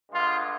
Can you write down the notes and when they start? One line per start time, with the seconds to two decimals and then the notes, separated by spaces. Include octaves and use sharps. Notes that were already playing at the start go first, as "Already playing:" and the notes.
0.11 G2 D3 G#3 F4